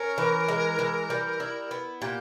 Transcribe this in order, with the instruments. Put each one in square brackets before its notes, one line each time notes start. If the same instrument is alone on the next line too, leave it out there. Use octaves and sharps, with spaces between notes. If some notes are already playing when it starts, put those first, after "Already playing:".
Already playing: [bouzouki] C#4 [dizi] A#4
[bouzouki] E3
G#3
E3
G3
E4
B3
[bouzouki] A#2 [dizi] G4